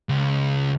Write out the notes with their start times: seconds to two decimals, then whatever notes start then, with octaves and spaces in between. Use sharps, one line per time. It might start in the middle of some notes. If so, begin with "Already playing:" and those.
0.09 C#2